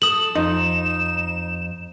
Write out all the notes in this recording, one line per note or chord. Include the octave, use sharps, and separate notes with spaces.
A4 D#6 E7 F#7
F2 D#4